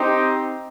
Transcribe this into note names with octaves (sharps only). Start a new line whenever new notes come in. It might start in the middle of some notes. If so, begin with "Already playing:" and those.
Already playing: C4 D#4 G4